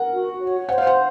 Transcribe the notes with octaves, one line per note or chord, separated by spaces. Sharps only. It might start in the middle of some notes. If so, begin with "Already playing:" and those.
Already playing: A#4 F#5
F#4
C#5
C5 F#5
F5
F#5